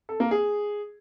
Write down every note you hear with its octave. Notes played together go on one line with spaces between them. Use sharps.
A4
A#3
G#4